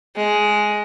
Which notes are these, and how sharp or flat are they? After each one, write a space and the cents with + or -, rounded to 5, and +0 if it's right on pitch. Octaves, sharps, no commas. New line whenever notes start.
G#3 +10